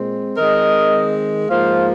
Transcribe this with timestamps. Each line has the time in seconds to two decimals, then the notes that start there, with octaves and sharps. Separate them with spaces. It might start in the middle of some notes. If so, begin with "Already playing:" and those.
Already playing: A#2 G#3 C4
0.37 D#3 G#3 C4 A#4 D#5
1.49 G#2 F3 A#3 C5 F5